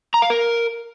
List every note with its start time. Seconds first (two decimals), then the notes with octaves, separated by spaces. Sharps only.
0.14 A#5
0.22 F5
0.30 A#4